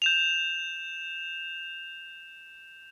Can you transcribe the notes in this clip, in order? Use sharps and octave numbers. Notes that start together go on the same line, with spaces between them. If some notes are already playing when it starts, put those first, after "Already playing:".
G6 E7 F7